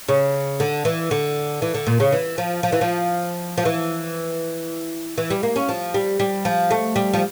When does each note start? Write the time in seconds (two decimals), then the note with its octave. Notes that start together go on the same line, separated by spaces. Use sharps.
0.08 C#3
0.60 D3
0.85 E3
1.11 D3
1.62 E3
1.75 D3
1.86 A#2
2.00 C#3
2.12 E3
2.38 F3
2.63 F3
2.72 E3
2.81 F3
3.58 F3
3.65 E3
5.18 E3
5.30 G3
5.43 A#3
5.56 C#4
5.69 F3
5.94 G3
6.20 G3
6.45 F3
6.71 A3
6.96 G3
7.13 F3